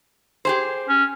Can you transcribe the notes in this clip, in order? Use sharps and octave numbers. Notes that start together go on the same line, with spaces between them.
G4 G#4 C5
C#4